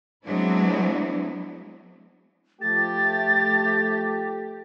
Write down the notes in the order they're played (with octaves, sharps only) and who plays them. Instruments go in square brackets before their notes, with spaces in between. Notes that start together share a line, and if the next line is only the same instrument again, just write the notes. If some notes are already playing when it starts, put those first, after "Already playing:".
[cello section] F#3 G#3 B3 C4 D4 E4
[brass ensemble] F3 A3 G4 [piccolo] A6